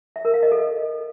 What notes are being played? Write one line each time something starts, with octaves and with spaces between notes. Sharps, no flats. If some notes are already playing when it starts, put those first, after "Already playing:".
E5
A#4
F5
D#5
A4